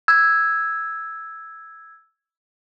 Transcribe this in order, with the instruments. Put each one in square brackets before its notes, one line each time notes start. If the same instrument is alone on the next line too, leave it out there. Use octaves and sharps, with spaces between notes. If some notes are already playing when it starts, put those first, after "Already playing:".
[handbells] E6 G#6